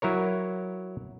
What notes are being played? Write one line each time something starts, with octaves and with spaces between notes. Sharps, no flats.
F#3 E4 A#4 C#5